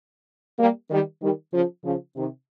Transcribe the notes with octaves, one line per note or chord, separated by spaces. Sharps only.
G3 A#3
D#3 G3
D#3 G3
C#3 F3
C#3 F3
C3 D#3